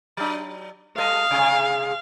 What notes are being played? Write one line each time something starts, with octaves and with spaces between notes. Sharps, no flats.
F#3 D4
G3 A4 D#5 F5
C3 G#3 G#4